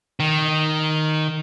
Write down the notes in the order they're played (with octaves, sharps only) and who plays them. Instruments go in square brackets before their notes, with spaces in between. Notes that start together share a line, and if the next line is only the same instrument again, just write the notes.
[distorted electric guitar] D#3